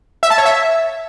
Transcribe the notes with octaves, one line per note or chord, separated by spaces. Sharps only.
E5
A5
C#5
E5